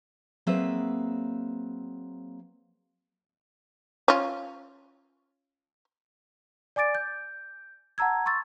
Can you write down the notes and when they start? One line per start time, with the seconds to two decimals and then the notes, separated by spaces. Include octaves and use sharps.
0.47 F#3 A#3 C4 G#4 B4 E5
4.08 C#4 F4
6.76 D5 G#5 D6 A6 D7
6.95 G6
7.98 F#5 A5 A#5 E6 G#6
8.26 C6 C#6 E6 A6